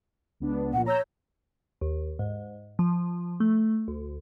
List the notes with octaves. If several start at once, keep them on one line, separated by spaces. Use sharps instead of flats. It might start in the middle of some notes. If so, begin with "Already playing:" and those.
C#2 B3 D4
A#2 F3 F#5
C#5 A#5 E6 G6
D#2
G#2
F3
A3
D2